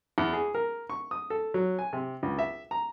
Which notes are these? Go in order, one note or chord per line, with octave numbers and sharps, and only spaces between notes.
E2
G#4
A#4
C#6
D#6
A4
F#3
G#5
C3
C#2
E5
A#5